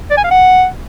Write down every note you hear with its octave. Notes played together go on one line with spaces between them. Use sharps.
D5
G#5
F5
F#5